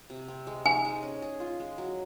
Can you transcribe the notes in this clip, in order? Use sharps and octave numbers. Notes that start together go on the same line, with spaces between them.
C3
C4
G#3
D#4 G#5
G#3
C#4
G#4
F4
G#3
F#3